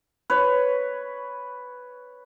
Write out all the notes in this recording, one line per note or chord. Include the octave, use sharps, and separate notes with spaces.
B4 C#5